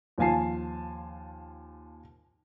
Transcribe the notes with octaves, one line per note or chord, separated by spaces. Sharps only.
D#2 F3 F4 G#5 A5 C7